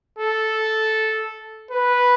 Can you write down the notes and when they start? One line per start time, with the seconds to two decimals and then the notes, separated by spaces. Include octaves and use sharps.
0.18 A4
1.71 B4